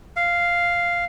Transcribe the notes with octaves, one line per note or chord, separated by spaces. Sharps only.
F5